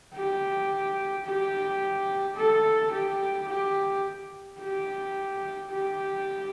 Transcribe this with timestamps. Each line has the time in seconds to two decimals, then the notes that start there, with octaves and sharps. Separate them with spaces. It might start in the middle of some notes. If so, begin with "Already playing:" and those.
0.14 G4
1.25 G4
2.36 A4
2.92 G4
3.49 G4
4.59 G4
5.71 G4